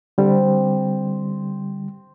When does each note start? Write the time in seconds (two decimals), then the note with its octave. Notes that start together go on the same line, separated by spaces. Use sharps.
0.18 D3 G3 C4